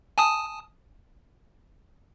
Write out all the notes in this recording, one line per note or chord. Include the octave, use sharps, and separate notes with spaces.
G#5 A5 D#6